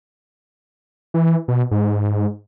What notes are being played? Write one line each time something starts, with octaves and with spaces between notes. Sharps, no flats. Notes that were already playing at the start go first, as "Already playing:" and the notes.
E3
B2
G#2